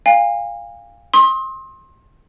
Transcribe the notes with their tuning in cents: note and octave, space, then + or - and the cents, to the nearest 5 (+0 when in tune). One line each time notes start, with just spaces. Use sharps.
F5 +5 G#5 -40
C6 +25 D#6 +45